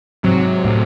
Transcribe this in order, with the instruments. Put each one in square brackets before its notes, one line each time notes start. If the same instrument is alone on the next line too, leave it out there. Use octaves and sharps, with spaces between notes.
[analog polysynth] G#2 C3 [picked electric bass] F#3
[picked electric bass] A2